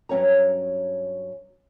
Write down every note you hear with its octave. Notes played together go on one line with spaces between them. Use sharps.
G2 F#3 C#4 C#5 A#5